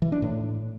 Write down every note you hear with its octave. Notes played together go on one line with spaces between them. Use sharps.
E3
D4
A2